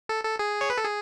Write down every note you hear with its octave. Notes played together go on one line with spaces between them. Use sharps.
A4
A4
G#4
C#5
B4
A4
G#4